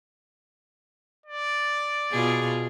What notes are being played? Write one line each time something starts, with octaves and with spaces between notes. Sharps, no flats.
D5
B2 F4 G#4